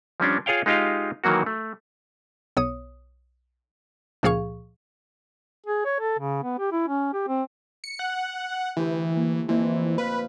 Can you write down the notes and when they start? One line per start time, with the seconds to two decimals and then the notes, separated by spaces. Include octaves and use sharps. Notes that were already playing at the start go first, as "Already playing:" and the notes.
0.20 F3 G3 C#4 D4
0.46 F4 G#4 C#5 F5 G5
0.66 G#3 D#4 F4 G4 D#5 F5
1.24 D#3 E3 F#3 A#3 F#4
1.46 A3
2.57 B1 C#5 D#6
4.23 C#2 A#2 F3 G#4 F5 C#6
5.66 G#4
5.85 C#5
6.00 A4
6.19 C#3
6.43 B3
6.59 G4
6.72 E4
6.88 C#4
7.13 G4
7.28 C4
7.84 C#7
7.99 F#5
8.77 D2 E3 G4 B4
9.16 A#3
9.49 F2 E3 A#3 C4
9.98 B4 F5